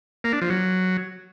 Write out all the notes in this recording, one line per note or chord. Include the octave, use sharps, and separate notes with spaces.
A#3
D4
F3
F#3